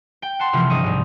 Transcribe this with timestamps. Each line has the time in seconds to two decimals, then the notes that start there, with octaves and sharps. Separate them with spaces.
0.22 G5
0.39 F#5 A5 C6
0.53 C3 E3 F3 C4 F4
0.70 G1 D#5 C#6
0.84 C2 G#2